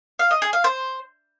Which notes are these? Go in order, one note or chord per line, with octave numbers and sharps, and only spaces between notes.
F5
D#5
G#4
F5
C5